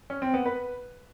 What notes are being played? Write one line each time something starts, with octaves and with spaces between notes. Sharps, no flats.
C#4
C4
B3
B4